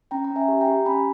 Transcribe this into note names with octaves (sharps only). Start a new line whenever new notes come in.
C#4 G5 A#5
A#5
C#4
E5 G#5
G4
G5 A#5
G4
C#4 G#5 B5